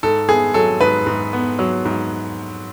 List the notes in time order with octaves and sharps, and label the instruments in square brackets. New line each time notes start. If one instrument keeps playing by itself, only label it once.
[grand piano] G#2 A4
B3 G#4
F#3 A4
G#2 B4
G#2
B3
F#3
G#2